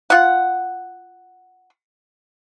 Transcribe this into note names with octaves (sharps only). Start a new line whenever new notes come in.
F4 F#5